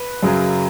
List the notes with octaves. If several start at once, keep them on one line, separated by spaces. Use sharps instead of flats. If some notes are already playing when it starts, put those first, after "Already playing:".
Already playing: B4
F#2 C#3 F#3